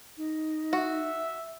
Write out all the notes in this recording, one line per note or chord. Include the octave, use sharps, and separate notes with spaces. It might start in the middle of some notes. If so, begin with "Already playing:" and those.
D#4
F#4 E5